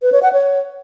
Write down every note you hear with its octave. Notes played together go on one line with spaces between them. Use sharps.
B4
C#5
F#5
C#5